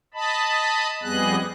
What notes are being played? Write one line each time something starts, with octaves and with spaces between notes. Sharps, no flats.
D#5 A5 B5
F2 G3 B3 G#4 D#5 F#6